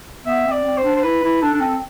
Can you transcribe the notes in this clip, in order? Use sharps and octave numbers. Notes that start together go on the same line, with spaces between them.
B3 E5
C4
D5
C4
C5
D4
C5
E4 B4
E4
D4 A4
D4
C4